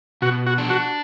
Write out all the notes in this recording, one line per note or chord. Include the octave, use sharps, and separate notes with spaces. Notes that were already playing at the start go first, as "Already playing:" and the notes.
B2 F#4
F#4
D4
F#4